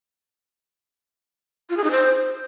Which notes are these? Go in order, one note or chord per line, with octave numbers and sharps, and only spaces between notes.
F4
G#4
D#4
C5